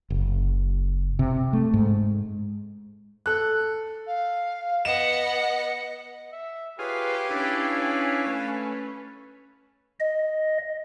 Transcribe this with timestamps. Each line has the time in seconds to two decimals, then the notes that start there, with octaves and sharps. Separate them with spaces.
0.10 F#1
1.19 C3
1.53 A3
1.74 G#2
3.26 A4 F#6
4.07 F5
4.85 B3 D#5 F#5 E7
6.32 E5
6.79 F4 G4 G#4 B4 C#5 F5 G#5
7.31 C#4 D4 E4 B4
8.27 A3 B4
10.00 D#5